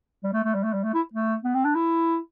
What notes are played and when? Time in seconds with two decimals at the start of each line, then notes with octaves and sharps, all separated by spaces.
0.24 G3
0.33 A3
0.44 A3
0.54 G3
0.64 A3
0.73 G3
0.84 A3
0.94 E4
1.14 A3
1.44 B3
1.54 C4
1.65 D4
1.75 E4